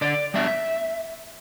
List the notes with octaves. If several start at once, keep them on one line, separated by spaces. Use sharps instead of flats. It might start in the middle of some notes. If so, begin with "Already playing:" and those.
D3 D5
G3 B3 D4 E5